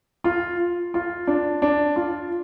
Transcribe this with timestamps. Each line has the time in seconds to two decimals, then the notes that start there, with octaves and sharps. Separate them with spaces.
0.24 F4
0.94 F4
1.27 D4
1.62 D4
1.96 F4